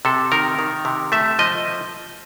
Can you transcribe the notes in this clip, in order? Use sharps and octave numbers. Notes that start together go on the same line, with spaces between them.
C3 A4
D#3 A#4
D#3
C3
A3 E5
F3 D#5